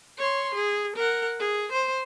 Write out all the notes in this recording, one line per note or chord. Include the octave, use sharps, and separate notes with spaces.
C#5 C6
G#4
A#4 F#5
G#4
C5